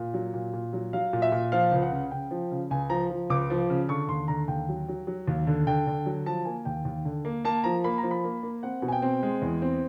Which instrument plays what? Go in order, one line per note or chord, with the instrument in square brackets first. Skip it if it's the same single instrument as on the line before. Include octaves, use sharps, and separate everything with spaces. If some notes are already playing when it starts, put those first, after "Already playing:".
Already playing: [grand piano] A#2
F#3
A#2
A#2
F#3
F#3 F5
A#2
E5
A#2
F3 F5
C#2
F#5
C#3
C#3 G5
F3
C#3
C#2 G#5
F3 A#5
F3
C#2 D6
F3
C#3
D3 C#6
D#2 C6
D3 A#5
D#2 G5
F#3
F#3
F#3
D#2
D3
D3 G5
D3
F#3
F3 A5
A#3 G#5
D#2 G5
D#2
D3
A#3
A#3 A5
F3 A#5
A#3 B5
A#5
F3
B5
A#3
A#3
C4 F#5
B2
G#5
G5
C4
G#3
E2
C4